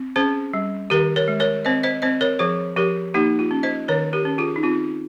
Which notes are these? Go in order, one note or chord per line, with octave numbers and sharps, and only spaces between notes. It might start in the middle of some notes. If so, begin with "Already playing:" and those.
Already playing: C4
C#4 G#4 C5
G3
D#3 G4 A#4
A#4 C#5
G#3
A#4 C#5
C4 C5 D#5
C5 D#5
C4 C5 D#5
A#4 C#5
F3 G#4 C5
F3 G4 A#4
A#3 D#4 G4
F4
C#4
C5 D#5
D#3 A#4 C#5
G4 A#4
C#4
F4 G#4
D#4
C4 F4